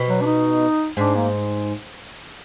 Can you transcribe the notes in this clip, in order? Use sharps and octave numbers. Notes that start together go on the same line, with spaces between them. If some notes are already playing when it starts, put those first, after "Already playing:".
Already playing: B2
F#3
D4
D#4
G#2 D4
A#3